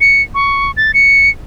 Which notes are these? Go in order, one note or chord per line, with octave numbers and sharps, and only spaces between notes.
C#7
C#6
A6
C#7